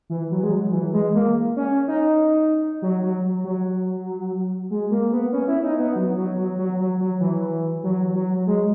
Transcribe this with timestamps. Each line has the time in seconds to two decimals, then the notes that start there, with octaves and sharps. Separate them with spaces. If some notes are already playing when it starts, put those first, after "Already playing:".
0.10 E3
0.31 F#3
0.43 G#3
0.52 F#3
0.72 E3
0.93 G#3
1.15 A#3
1.56 C#4
1.88 D#4
2.82 F#3
3.03 F#3
3.44 F#3
4.70 G#3
4.91 A#3
5.12 B3
5.33 C#4
5.48 E4
5.64 D#4
5.79 B3
5.96 F#3
6.17 F#3
6.38 F#3
6.58 F#3
6.80 F#3
7.00 F#3
7.20 E3
7.84 F#3
8.15 F#3
8.47 G#3